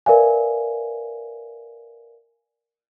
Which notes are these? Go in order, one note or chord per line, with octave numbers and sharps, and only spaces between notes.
A#4 B4 D5 E5 F5 G#5